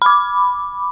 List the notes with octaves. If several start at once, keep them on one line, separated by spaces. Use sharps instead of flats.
B5 D6